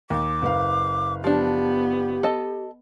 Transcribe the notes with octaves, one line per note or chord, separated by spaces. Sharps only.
D#2 D6
F#1 B4 F5
F3 B3 D4 G4
A4 D#5 A5